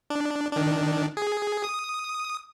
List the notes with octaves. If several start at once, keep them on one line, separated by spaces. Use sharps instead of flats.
D4
D#3 D4
G#4
D#6